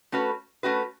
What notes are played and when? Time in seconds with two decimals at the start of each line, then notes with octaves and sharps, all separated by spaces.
0.12 A3 C#4 F#4 B4
0.63 A3 C#4 F#4 B4